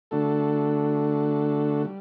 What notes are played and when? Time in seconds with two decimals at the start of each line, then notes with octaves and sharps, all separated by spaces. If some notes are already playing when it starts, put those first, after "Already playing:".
0.11 D3 A3 D4 F#4 A4
1.85 G3